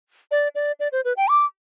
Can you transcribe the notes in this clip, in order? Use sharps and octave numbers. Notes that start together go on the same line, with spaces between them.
D5
D5
D5
C5
B4
G5
D6